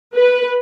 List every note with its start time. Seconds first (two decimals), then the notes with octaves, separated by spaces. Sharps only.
0.16 B4